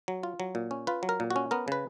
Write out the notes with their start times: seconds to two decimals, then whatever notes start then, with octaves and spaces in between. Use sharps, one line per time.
0.08 F#3
0.23 F4
0.40 F#3
0.55 A#2
0.71 C#4
0.87 F4 B4
1.03 F#3
1.09 A#4
1.20 A#2
1.30 F#4
1.36 C#4
1.51 B3 A#4
1.68 C#3 B4